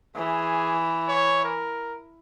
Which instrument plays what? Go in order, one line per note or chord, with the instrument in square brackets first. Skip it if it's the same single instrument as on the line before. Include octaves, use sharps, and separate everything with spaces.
[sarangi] E3 [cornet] G#4
[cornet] C#5
A#4